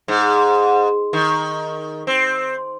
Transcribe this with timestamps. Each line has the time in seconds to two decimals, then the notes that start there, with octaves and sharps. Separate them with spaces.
0.08 G#2
1.13 D#3
2.07 C4